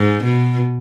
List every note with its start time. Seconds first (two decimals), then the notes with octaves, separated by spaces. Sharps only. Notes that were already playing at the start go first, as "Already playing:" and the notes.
Already playing: G#2
0.24 B2